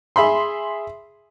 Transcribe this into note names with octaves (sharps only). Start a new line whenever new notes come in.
G#4 E5 B5 C6